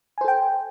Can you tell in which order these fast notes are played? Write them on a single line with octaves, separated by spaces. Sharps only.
G#5 C5 A4 G5